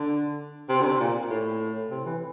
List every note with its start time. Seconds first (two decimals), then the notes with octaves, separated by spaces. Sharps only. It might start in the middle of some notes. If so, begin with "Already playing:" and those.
Already playing: D3
0.69 C3
0.81 D3
0.85 C3
1.00 A#2
1.30 A2
1.90 C3
2.06 E3